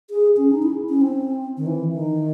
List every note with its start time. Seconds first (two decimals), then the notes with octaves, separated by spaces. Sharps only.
0.10 G#4
0.37 C#4
0.51 D#4
0.62 E4
0.89 C#4
1.01 C4
1.57 D#3
1.66 E3
1.92 D#3